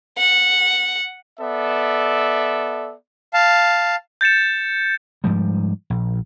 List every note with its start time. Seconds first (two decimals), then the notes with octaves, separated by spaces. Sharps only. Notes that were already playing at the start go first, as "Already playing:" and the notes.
0.18 F#5
1.40 B3 A4 D5 E5
3.33 F5 A5
4.21 G6 A6 C#7 E7
5.24 G#2 F3 G3
5.90 A#1